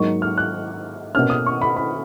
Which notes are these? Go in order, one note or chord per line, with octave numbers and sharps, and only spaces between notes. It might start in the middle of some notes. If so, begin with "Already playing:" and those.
Already playing: G#2 F#3 A#3 D#4 C#6
F6
F#6
B2 A#3 C#4 F6
D#6
C#6
B5
B5